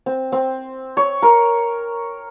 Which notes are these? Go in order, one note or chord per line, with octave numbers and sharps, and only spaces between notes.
C4
C4
C#5
A#4